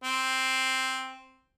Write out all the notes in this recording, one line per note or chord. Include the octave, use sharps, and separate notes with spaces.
C4